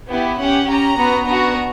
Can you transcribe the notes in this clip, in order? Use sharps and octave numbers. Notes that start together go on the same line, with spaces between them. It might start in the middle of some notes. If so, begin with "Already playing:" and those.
B3 E4 G4
C#4 G4 F#5
C#4 G4 A#5
B3 F#4
B3 D4 F#4 A#5